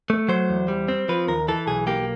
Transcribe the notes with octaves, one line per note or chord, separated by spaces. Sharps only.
A3
F#3 C5
E2
G3
C4
F3 B4
D#2 A#4
E3 A4
B1 G#4
A#3 G4